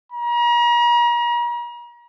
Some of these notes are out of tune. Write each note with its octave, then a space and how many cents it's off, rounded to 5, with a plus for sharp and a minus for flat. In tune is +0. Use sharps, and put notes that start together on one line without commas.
A#5 +40